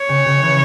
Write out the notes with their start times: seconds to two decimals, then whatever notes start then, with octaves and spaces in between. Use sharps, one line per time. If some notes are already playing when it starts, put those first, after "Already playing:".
Already playing: C#5
0.09 C#3
0.26 C#3
0.42 E3